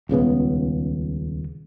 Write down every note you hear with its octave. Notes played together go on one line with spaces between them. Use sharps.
D#1 C#2 C#3 B3